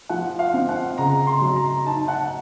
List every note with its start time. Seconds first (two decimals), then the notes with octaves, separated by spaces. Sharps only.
0.09 F3 F#5
0.39 F5
0.54 C4
0.69 F#5
0.98 C#3 A#5
1.27 C6
1.41 F#3
1.56 A#5
1.86 D#4 A5
2.08 F#5